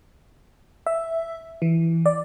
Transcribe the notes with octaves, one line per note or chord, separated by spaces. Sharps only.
E5
E3
D5